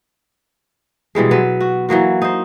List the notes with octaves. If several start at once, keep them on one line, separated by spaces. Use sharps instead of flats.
B2 E3 G3 G#3
F#3 B3
F#4
E3 F#3 A#3 F#4
D#4 C5